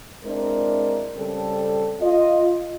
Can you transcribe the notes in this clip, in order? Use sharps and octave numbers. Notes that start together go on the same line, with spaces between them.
G#3 C4 D4 E4 A#4
C#3 G3 C4 A4
F4 D#5